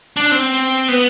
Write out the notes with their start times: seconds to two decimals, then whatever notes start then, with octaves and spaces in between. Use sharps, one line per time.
0.17 D4
0.31 C4
0.88 B3